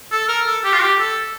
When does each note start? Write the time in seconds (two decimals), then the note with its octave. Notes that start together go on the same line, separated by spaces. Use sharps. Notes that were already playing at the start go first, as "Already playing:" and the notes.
0.12 A4
0.28 A#4
0.46 A4
0.64 G4
0.73 F4
0.81 G4
0.99 A4